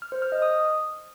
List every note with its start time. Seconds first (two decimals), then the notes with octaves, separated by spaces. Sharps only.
0.02 F6
0.12 C5
0.22 F6
0.32 D#5
0.42 D#6